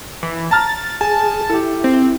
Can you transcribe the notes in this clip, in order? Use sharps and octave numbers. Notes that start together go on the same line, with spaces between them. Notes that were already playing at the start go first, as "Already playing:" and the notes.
E3
A5 A#5 F6 A6
G#4 G#5 A5
E4 G4 A4
C4